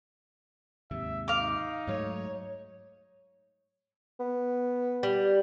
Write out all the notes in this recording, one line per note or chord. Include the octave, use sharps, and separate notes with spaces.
D#2 G#2 C3 E5
D#4 F5 D6
G#2 F#3 A3 C#5
B3
G3